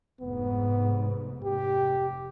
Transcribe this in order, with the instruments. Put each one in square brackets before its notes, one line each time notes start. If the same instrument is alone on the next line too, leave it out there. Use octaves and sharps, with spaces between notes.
[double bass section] F1 G#2 [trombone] B3
[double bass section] F1 [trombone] G4